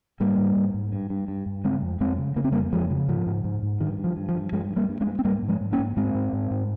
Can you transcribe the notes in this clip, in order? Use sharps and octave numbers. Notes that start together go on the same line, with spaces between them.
G#2 G3 A#3
G#2
G#2
G#2
G2
G2
G2
G2
C#3 G#3 C4
F2
F2 G#3 C4
C#3
C#3 A#3
C4
F2 G3 A#3
F2 F3 G#3
C#3
G#2 F3
G#2
G#2
G#2
G2 D#3
G2
F3
G2
F3
G2
G2 F3 G#3
G2
G3 A#3
G2
G#3 C4
G2
C4
G#2 G3 A#3
G#2
F3 G#3
G#2
A#3 C#4
G#2
G#2 G#3 C4
G#2
G#2
G#2